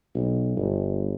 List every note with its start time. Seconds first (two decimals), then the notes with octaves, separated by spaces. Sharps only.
0.15 B1
0.56 G1